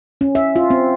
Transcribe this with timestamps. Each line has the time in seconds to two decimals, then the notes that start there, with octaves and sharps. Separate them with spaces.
0.21 C#4
0.35 E5
0.56 F4
0.70 C4